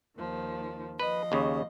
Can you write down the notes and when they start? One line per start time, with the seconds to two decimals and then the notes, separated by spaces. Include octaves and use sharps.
0.18 D#2 D#3 F3
1.00 F3 B4 D#5
1.32 D#2 C#3